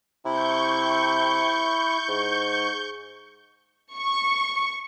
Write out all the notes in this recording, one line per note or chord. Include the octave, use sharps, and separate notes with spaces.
C3 E4 C#6 G6
G#2
C#6